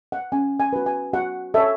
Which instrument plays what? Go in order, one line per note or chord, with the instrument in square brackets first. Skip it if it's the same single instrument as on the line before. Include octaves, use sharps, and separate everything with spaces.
[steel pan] F#5
C#4 G#5
G#5
F#4 B4
G#5
F#4 F#5
A4 C#5 E5